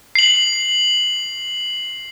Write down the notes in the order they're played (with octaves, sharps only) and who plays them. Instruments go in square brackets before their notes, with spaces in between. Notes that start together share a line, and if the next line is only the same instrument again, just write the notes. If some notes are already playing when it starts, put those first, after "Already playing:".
[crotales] C7 F#7